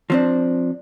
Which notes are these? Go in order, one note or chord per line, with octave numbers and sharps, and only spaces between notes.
F3 C4 D4